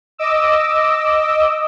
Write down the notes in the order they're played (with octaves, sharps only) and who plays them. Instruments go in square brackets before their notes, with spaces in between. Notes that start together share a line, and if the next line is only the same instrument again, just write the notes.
[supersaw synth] D#5 D6 E6